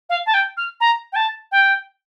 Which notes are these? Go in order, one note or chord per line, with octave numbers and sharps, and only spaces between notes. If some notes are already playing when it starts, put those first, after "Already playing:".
F5
A5
G5
F6
A#5
G5
A5
G5